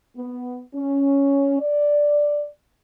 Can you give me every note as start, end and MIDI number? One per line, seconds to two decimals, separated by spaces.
0.17 0.59 59
0.75 1.58 61
1.60 2.46 74